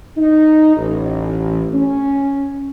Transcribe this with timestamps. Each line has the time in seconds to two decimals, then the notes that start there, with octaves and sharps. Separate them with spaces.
0.17 D#4
0.76 A1
1.72 C#4